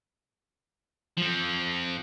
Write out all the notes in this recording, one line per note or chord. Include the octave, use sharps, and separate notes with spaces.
F3 C4